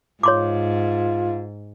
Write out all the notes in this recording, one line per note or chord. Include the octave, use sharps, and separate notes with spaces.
G#2 F4 C#5 C6 D6